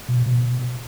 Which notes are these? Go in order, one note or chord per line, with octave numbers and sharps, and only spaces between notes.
B2
B2